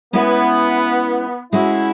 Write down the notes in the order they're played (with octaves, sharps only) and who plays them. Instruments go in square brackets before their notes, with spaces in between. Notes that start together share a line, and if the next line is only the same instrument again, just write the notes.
[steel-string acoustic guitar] G#3 C#4 E4 B4 [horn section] B3
[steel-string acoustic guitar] G#3 C#4 F#4 [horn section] E4